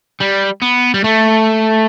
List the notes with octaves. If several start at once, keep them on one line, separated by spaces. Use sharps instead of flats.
G3
B3
G3
A3